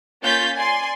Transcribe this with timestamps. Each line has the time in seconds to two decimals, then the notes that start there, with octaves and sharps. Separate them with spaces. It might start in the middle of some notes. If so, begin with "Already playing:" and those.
0.22 A#3 C#4 F4 G6 A6 B6
0.56 D5 G#5 C6